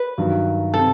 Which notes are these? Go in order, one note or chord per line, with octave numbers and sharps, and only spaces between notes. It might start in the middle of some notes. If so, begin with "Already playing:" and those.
Already playing: B4
G2 D#3 F#3
C3 A4